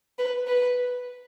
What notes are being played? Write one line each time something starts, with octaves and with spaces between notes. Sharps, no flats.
B4
B4